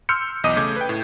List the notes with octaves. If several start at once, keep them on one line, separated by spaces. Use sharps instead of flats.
C6 E6 F6 G6 C#7
B1 E2 D#5 D6 D#6 D#7
C#3 A3 D6 G6 G#6
B4 G5
A2